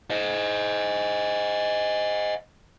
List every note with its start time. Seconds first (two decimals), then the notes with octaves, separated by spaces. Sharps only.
0.10 C5 D#5